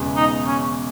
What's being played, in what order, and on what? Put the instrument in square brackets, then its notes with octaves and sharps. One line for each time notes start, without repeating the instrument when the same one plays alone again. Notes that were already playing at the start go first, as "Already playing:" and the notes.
Already playing: [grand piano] E1 E2 C#3 G#3
[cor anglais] D#4
C#4